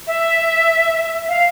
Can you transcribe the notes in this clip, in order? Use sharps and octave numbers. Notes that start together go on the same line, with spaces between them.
E5
F5